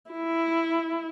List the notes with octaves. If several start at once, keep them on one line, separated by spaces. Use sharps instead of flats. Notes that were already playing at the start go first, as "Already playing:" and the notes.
E4